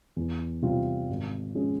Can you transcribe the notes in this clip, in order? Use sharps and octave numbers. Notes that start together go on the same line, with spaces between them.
E2
C3 G3 C4 F4
G#1
F3 G#3 C#4